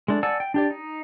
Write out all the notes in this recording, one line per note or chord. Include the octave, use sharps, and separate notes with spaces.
G#3 A3 D4
D5 F#5 G#5 A5 E6
G5
D4 G4 D5
D#4